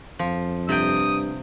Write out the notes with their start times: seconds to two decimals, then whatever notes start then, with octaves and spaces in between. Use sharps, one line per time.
0.19 F2 F3
0.69 G2 C3 G5 D#6